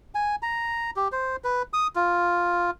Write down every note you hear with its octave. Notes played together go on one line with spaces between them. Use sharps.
G#5
A#5
G4
C5
B4
D#6
F4